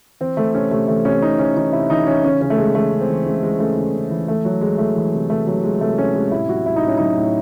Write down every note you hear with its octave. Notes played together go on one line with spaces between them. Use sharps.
E3 C4
E3 A3
C3 C#4
C3 A3
E3 A3
C3 C#4
C3 D#4
E3 C#4
E3 D#4
C3 E4
E3 D#4
E3 C#4
C#3 C#4
C#3 C#4
A3
C#3 G#3
E3 A3
C#3
C4
E3
C#3 G#3
E3 G#3
C#3 A3
C#3
C#3
E3
E3 A3
E3 F#3
E3 G#3
E3 A3
E3
C3
C3 A3
C3 F#3
C3 G#3
C3 A3
C3 C#4
C3 G#3
A2 E4
F#3 F#4
A2 E4
D#4
A2 C#4
F#3 D#4
A2